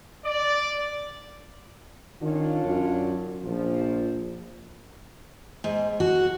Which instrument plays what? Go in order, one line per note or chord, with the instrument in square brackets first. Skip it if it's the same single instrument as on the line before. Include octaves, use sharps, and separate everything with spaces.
[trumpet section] D5
[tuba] D#3 [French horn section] C#4 D4 F4
[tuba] F#2
[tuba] A#1 [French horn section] F3
[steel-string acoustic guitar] G#2
F#4